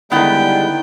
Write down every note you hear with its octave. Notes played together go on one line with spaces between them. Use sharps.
D3 D#3 G3 G#3 B3 E4 B4 G5